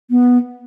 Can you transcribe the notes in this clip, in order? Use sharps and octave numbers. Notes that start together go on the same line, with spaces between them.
B3